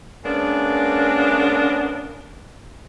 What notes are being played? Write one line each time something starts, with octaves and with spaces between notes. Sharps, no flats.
G#3 A#3 B3 C#4 D4